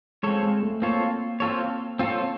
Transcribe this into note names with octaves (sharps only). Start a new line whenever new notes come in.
G#3 C4 F4 A4 C#5
G#3
A3
A#3 C4 F4 A4 C#5
C4 F4 A4 C#5
C4 F4 A4 C#5